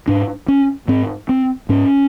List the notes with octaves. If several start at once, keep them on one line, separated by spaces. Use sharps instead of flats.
G#2 D4
C#4
G#2 C4
C4
G#2 C#4